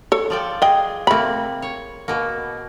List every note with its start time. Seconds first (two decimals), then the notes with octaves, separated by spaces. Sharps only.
0.12 A4 C#5
0.30 F3 D5 G5
0.62 G#4 D#5 G5
1.07 C3 A3 A#3 B5
1.62 C#5
2.08 B2 A#3